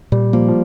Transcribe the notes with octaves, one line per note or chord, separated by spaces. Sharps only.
A#2 G3
F3 A#3
F3